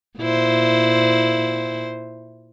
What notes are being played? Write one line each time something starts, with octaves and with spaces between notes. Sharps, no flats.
A#2 E4 C5